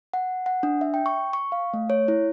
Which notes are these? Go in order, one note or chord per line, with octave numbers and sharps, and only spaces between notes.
F#5
F#5
D4
E5
G5
C#6
C#6
F5
A3
C#5
E4